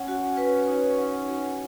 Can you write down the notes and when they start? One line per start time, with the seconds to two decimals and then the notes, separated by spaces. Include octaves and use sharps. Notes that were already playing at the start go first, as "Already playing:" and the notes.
Already playing: C#4 F#5
0.08 F#4
0.37 B4
0.68 D#4
0.98 F#5
1.29 F#4